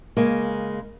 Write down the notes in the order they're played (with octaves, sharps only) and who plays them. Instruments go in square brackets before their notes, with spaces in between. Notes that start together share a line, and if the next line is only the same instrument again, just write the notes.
[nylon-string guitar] C#3 G#3 A#3